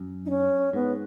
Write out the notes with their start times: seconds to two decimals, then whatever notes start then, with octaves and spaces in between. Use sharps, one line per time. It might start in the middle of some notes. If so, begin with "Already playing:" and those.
Already playing: F#2
0.25 D#4
0.29 C#4
0.73 G#2 B3